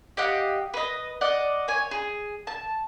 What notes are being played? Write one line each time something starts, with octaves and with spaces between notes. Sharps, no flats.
G4 D#5 F5 F#5
B4 D#5
D5 D#5 F#5
C#5 G#5
G#4
A5